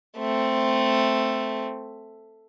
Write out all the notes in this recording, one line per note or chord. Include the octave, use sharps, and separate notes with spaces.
A3 C4